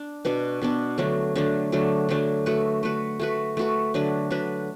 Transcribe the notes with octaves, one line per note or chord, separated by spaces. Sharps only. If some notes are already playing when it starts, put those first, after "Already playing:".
Already playing: D4
B2 B3 D4
B2 B3 D4
D3 F#3 A3 D4
D3 F#3 A3 D4
D3 F#3 A3 D4
D3 F#3 A3 D4
A3 F#4 B4
A3 F#4 B4
A3 F#4 B4
A3 F#4 B4
D3 F#3 D4 B4
D3 F#3 D4 B4